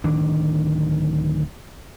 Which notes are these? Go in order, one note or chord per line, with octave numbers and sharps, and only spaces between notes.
D1 D#3 D4